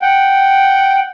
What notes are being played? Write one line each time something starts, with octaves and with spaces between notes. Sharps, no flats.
F#5 G5